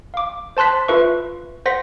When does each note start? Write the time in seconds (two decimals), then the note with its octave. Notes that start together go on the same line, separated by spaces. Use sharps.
0.14 F5 D6
0.57 C5 A5 C6 F#6 B6
0.88 F4 B4 E5 C#6
1.66 C5 F#5 C6 A#6 B6